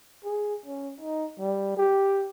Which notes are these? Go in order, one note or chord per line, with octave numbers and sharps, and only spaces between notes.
G#4
C#4
D#4
G3
G4